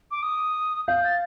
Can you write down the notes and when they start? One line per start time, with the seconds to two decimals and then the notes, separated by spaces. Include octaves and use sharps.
0.11 D6
0.23 D#6
0.88 F5 G6
1.04 A6